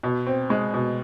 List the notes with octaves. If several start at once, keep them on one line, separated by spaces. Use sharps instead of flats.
B2
C4
G#3
B2